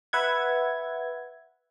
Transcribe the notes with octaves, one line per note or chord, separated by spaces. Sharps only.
B4 E5 F#5 G#6